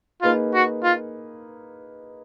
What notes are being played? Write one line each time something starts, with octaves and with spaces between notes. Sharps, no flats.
A#3 D#4 F4 G#4 B4
F#4
F4